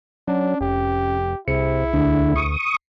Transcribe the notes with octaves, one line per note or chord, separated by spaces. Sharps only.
F#3 C#4 D4
F1 G4
C2 C3 E4 G#4 C#7
D2 D3
C#6 D#6